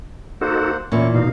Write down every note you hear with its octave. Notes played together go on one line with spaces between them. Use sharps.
A#3 D#4 F#4 A4 C5 F#5
E2 A#2 C#4 E4 C#6
B2 D#4 F5